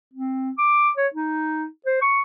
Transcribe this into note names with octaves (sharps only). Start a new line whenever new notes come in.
C4
D6
C#5
D#4
C5
C#6